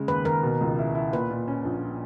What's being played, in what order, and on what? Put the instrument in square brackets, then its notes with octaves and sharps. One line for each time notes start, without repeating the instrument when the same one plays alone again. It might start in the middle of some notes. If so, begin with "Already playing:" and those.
Already playing: [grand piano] C#3 G#3
[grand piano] D#2 [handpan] B4
[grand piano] D#2 [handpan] A#4
[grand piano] B2
C#2
E4
E4
[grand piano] A#2 [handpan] B4
[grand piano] A#2
C#4
A#1